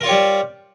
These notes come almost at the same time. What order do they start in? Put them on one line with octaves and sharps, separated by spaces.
A#4 F4 C#5 G4 G3